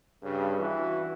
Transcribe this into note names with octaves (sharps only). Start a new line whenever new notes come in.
G2 C#3
E3 F#4